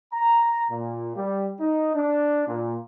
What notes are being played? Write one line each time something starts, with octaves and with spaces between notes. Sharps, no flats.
A#5
A#2
G3
D#4
D4
A#2